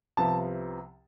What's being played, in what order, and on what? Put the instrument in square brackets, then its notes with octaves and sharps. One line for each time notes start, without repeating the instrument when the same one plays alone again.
[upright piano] C2 C3 F3 B3 A5